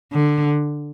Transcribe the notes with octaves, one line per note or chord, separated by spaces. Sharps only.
D3